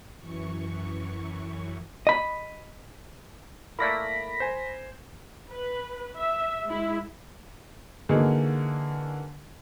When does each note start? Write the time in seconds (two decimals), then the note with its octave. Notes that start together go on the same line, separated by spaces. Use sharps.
0.19 F#2 E3 C#6
2.07 D#5 B5
3.79 A3 A#3 E4 A#4 D5 B5 A#6 B6
4.40 C5 G#5
5.49 B4
6.18 E5
6.67 G#3 E4
8.09 D3 E3 A#3 D#4 F#4 G#4